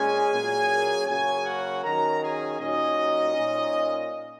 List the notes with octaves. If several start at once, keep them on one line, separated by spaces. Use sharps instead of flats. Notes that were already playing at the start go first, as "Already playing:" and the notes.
Already playing: A#2 G#3 C#4 G#4 G#5
A#2 F#3 A#3 C#4
C#3 F#3 A#3 C#4 G#4 G#5
F#4 F#5
D#3 F#3 C#4 A#4 A#5
G#4 G#5
A#2 F#3 C#4 D#4 D#5
A#2 A#3 C#4